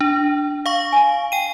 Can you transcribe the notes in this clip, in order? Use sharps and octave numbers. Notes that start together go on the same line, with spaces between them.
D4
F5 C#6
G#5
G5 D#7